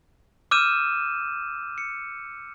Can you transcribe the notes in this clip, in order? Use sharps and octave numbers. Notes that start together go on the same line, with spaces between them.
D6 E6 F6 G6 D#7 E7
C#7